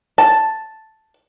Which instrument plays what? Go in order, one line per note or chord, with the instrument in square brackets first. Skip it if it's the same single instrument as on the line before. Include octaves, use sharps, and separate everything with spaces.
[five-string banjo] A5